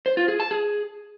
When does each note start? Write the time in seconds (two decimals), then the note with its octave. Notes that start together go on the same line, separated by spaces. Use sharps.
0.06 C5
0.17 F4
0.28 G#4
0.40 A5
0.51 G#4